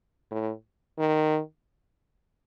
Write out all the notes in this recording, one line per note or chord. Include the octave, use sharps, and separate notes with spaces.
A2
D#3